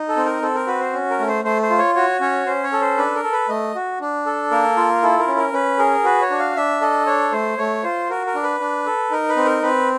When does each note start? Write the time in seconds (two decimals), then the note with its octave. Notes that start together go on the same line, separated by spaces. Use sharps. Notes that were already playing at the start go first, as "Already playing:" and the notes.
Already playing: D#4
0.09 A4
0.17 C4
0.26 A#4
0.42 C4 A4
0.55 A#4
0.67 F#4 B4
0.80 C5
0.93 C#4
1.10 A#4
1.19 A3
1.28 C5
1.44 A3 C5
1.62 C5
1.70 F4
1.78 C#5
1.95 F#4 C#5
2.21 C#4 C#5
2.47 C#4 C5
2.63 C#5
2.73 A4
2.81 C5
2.97 D4 B4
3.15 A#4
3.23 A4
3.32 B4
3.48 A3 D#5
3.75 F#4
4.01 D4
4.26 A4
4.51 A#3 A#4
4.77 F4
5.02 E4 A4
5.19 A#4
5.28 C#4
5.37 A#4
5.53 C#4 B4
5.79 G#4 A#4
6.04 F#4 B4
6.22 C#5
6.30 D4
6.39 F5
6.56 D4 E5
6.81 A4 D#5
7.06 D4 C#5
7.32 A3 C5
7.58 A3 C#5
7.83 F4 C5
8.09 F#4 A#4
8.27 A#4
8.35 D4
8.43 B4
8.60 D4
8.86 A4
9.11 D#4 A#4
9.29 B4
9.37 C4
9.45 A#4
9.62 C4 B4